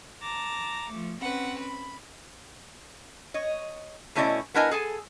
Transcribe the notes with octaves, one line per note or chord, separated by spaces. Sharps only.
A5 A#5 D6
F3 A3
C4 C#4 B4 F#5
B5
C#5 D#5
B2 A3 C#4 E4 D5 D#5
B3 D4 E4 A#4 D#5 G#5
G#4 A4 G#5